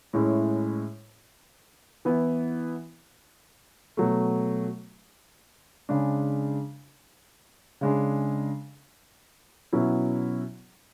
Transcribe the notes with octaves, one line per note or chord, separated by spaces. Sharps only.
A2 G#3 C#4 E4
E3 B3 E4
B2 F#3 A3
C#3 G#3 D4
C#3 G#3 D4
B2 F#3 C#4 E4